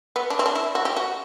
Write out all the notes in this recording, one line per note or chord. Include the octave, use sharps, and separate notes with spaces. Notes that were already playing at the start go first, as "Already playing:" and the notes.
B3
D4
C4
D4
E4
F#4
G4
F#4